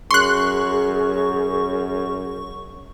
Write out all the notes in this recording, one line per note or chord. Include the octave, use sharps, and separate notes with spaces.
F#2 G#4 C6 C#6 F#6